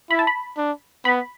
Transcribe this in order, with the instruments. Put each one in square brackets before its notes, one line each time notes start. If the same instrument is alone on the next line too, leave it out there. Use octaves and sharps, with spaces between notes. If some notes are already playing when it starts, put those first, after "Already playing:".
[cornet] E4 [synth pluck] B5
[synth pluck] A5
B5
[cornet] D4
[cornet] B3 [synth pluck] B5